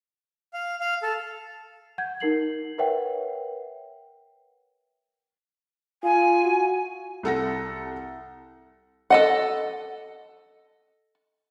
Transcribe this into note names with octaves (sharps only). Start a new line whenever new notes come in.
F5
F5
A4
F#5 G6 G#6
D#4 A#4 C7 F#7
A#4 B4 C#5 E5 F#5 G5
F4 G#5
F#4
C2 A4 F#5 A#6
A4 D#5 F#5